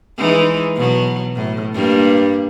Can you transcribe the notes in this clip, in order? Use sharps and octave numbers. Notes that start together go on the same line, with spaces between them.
E3 G#3 D#4
B2 F#3
A2
G2 A#3